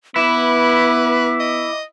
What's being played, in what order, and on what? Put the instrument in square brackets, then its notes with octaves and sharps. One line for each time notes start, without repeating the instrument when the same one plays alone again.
[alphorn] B3 [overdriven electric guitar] E4 [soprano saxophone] B4 [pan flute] D6
[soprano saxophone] D#5